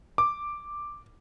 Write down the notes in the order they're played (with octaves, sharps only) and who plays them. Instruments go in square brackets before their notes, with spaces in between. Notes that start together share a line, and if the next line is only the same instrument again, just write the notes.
[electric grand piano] D6